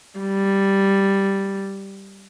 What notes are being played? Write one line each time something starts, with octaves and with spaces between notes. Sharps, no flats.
G3